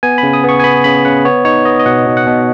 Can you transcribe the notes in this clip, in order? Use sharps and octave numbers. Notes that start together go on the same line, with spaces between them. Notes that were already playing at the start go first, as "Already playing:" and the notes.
B3 G#5
B5
C#3
D#6
B3 C#6
G#5
B3 B5
C#3 B5
C#3 F#5
B3 C#5
D#4 C#5
B3 D#5
D#5
B2 F#5
B2
F#5
B2